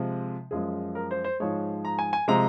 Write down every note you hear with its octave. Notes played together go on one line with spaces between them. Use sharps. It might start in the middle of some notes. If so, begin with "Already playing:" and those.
Already playing: C3 F3 G#3
F#2 F3 G#3 G#4
A#4
C5
C5
G#2 F3 G#3 C#5
A#5
G#5
G#5
C3 F3 G#3 A#5